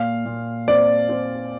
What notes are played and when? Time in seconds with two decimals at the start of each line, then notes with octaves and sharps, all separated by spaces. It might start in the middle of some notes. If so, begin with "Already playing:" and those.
Already playing: A#2 F5
0.26 A#2
0.68 C4 D5
1.09 C4